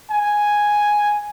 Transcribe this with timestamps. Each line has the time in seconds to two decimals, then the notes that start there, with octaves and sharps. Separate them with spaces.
0.11 G#5